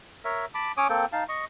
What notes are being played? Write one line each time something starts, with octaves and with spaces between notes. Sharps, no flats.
A#4 C#5 E5
A5 B5 D6
C#4 C#5 D6 D#6
A#3 C4 A4 G5
D#4 F5 A5
D#5 C#6